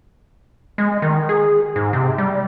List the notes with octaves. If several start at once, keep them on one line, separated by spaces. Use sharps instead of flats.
G#3
D#3
G#4
G#2
C3
G3